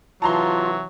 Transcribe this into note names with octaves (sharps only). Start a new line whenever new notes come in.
C3 E3 F#3 F4 A5 A#5 C6